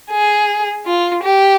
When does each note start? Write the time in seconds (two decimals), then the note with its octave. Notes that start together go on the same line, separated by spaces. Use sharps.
0.10 G#4
0.86 F4
1.23 G4